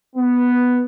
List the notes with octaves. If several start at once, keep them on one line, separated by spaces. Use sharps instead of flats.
B3